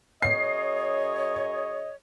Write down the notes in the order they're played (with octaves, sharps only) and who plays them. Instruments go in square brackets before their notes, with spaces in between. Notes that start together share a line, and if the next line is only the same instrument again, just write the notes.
[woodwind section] F#2 G#4 C#5 [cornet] D#5 [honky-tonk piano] C7